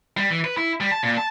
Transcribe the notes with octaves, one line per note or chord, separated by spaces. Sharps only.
G3
E3
B4
E4
G3
A5
A#2
A5